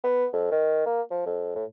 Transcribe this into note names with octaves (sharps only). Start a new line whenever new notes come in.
B3
F2
D#3
A#3
F3
F2
A2